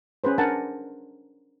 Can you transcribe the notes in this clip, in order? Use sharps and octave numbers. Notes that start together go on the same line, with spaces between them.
C#4 G#4 B4 C5
D4 A#4 F#5 G#5 A5